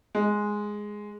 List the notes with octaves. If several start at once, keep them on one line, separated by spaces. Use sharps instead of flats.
G#3